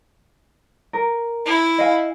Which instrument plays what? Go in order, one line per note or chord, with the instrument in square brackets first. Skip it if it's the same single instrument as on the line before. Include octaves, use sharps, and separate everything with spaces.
[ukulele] A#4
[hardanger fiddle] E4
[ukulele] D#5 F5 G#5